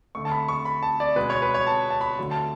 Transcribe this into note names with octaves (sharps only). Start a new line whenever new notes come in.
D3 A3 C#6
A5
B5
C#6
B5
A5
D5
B2 G#3 B4
C#5
B4
C#5
A5
A5
B5
D3 F#3 A3
A5